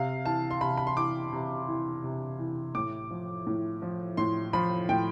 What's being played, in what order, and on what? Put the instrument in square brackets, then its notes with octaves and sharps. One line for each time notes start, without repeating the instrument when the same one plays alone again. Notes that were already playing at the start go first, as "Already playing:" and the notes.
Already playing: [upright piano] C3 F5
E3 A5
C6
C3 B5
B5
C6
E3 D6
C3
E3
C3
E3
A2 D6
F3
A2
F3
A2 C6
F3 B5
A2 G5